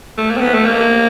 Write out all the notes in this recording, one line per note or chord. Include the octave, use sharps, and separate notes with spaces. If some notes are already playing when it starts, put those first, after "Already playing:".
A3
A#3
C4
B3
A3
A#3